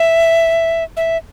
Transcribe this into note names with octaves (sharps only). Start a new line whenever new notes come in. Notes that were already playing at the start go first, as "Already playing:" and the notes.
Already playing: E5
E5